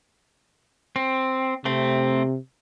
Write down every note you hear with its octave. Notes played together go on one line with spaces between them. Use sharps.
C4
C3 A3 C4